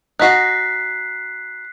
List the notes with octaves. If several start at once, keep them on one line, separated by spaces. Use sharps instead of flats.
D#4 F#4 F#6 B6 C7